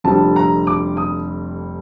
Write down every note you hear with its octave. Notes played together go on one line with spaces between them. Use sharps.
F1 F2 D3 G3 C4 A5
A#5
D6
D#6